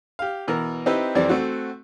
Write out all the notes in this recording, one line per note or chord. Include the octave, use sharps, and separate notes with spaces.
G4 F5
B2 E3 A#4
C4 D#4 E4 G4 B4
F2 E3 G3 C4 D5
A3 C4 F#4